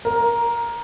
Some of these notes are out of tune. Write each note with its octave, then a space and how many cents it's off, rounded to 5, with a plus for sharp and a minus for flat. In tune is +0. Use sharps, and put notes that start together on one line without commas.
A#4 +10